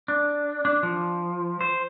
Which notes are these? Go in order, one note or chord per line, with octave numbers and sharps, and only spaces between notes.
D4
D4
F3
C5